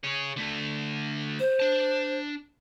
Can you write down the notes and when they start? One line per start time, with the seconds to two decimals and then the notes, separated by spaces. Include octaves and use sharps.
0.03 G#4 C#5
0.37 D3 A3
1.39 C5
1.60 D4 A5